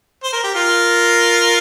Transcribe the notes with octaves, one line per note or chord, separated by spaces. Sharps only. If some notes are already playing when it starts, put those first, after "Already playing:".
C5
A#4
G4
F4 A#4